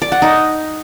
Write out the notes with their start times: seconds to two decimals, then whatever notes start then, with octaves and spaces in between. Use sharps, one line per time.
0.02 D5
0.12 F#5
0.22 D#4